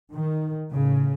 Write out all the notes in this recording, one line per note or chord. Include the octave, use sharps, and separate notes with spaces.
D#3
A1 A2 C#3